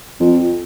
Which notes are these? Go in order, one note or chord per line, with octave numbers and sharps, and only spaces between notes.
F2